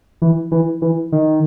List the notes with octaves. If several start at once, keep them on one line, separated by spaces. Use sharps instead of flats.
E3
E3
E3
D#3